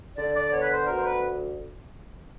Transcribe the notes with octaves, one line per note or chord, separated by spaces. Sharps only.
D3 D5
D5
B3 C#5
B4
C5
D2 A#4
C5
B4